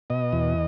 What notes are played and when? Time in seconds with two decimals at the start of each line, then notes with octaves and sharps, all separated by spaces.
0.10 B2 D#5
0.33 E2